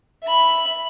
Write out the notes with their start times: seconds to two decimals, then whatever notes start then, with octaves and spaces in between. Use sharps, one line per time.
0.23 E5 B5